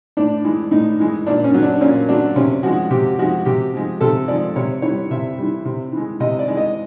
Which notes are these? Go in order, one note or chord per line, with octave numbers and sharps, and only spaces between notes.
A2 D4
E3 G#3
A2 D#4
E3 G#3
A#2 D4
C#4
F#3
D4
A#2 C#4
F#3 D4
C3 C#4
F3 G#3 F#4
C3 G4
F3 G#3 F#4
C3 G4
F3 G#3
C3 A4
F3 G#3 D5
C3 C#5
E3 C#5
G3
C3 E5
E3 G3
C3
E3
G#3
C3 D#5
D5
E3 G#3
D#5